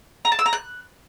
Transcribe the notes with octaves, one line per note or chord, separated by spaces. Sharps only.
A#5
A5
E6
A#5
F#6